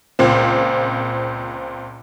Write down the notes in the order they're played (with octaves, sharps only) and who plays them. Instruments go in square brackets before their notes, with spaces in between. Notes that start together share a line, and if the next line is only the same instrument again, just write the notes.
[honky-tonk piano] C#2 A#2 C4